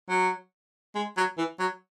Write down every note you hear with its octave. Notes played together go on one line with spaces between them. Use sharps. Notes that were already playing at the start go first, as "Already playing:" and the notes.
F#3
G#3
F#3
E3
F#3